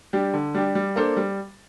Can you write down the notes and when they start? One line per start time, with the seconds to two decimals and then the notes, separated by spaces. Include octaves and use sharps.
0.13 G3 D4 G4
0.33 D3
0.55 G3 D4 G4
0.75 G3
0.96 A#3 D4 A4 C5
1.17 G3